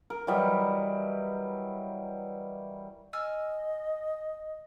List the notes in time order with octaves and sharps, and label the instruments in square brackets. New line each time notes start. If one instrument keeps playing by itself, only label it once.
[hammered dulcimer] A#4
E3 F#3 G3 D#5
[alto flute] D#5 [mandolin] G#5 E6 F6